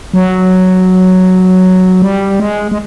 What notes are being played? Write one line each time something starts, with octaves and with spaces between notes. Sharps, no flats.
F#3
G3
G#3
G#3